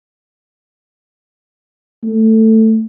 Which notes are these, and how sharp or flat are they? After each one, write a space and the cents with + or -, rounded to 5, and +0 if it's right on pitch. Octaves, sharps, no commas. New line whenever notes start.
A3 +10